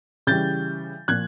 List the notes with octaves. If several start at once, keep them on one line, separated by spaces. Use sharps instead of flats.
C#3 E3 G3 G6 A6
A#2 F3 F#6 G#6